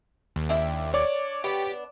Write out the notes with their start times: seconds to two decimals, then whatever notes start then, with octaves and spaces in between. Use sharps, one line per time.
0.36 D#2
0.49 D4 E4 G5
0.94 D4 C#5 D5 D6
1.44 B3 D4 G4